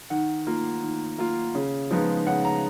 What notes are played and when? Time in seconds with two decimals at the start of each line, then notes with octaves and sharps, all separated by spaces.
0.10 D#3 F#5
0.47 A#3 F4
0.83 D#3
1.18 A#3 F4
1.55 C#3
1.91 F3 G#3 B3 D#4
2.27 C#3 F#5
2.45 A#5